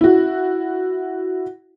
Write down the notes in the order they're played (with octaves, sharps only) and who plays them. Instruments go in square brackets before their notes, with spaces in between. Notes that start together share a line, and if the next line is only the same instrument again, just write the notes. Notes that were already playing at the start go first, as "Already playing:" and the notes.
[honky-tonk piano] E4 F#4